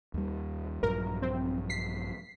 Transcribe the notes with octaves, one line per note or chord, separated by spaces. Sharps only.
D#2 G3
A#1 G2 F#3 A#4
C4
B6 C7